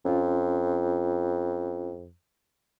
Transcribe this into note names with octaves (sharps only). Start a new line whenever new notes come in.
F2 C#4 F4